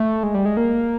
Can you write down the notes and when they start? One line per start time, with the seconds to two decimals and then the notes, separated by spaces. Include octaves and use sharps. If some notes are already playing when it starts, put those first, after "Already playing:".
Already playing: A3
0.23 G#3
0.34 G3
0.45 G#3
0.57 A#3